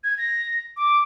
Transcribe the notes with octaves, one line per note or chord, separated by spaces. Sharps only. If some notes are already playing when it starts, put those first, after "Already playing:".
G#6
A#6
D6